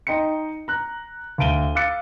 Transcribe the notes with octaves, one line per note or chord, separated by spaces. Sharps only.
D#4 D#5 G5 C6 C#7
A#5 F#6
D2 F5 A5 D7 D#7 G7
F5 D6 E6 F#6 A6 C#7